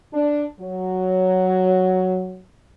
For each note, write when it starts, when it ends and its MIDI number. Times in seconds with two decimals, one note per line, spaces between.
0.13 0.44 62
0.60 2.42 54